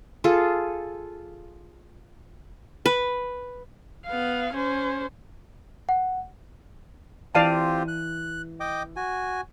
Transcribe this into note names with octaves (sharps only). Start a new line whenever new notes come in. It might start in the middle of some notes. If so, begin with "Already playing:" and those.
F4 G#4 A4
B4
B3 F5
C#4 C5
F#5
E3 C4 F4 G4 D5 F5 A5 D#7
F#6
D#5 G5 D6
F#4 G#5